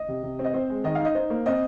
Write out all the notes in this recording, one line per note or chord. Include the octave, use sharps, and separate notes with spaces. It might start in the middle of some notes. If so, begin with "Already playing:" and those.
Already playing: D#5
C3
C3
C4
D#5
C4 C5
G#3
D#3 D#5
D#4 F5
D#5
D#4 C5
A#3
C4 D#5